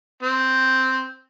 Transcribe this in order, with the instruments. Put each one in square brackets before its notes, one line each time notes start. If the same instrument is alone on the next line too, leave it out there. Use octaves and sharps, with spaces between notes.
[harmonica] C4